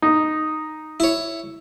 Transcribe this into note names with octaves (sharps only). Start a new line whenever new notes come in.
D#4
E4 C#5